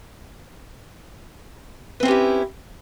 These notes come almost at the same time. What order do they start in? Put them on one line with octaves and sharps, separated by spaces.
B4 C4 C#4 G4 E4